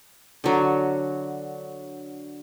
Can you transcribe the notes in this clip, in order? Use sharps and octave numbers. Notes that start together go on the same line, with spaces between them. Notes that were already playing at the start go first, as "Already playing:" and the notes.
D3 F#3